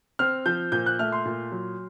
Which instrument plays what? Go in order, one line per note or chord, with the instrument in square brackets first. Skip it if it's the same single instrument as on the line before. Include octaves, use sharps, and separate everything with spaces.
[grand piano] C4 F6
F3 G6
A#2 G6
F#6
A3 F6
C6
A#2
F#3